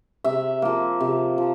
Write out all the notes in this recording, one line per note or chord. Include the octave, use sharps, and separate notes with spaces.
C3 E5
F3 A#3
C3
F3